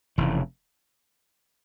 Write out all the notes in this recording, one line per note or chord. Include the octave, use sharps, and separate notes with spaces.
F1 F2 C#3 E3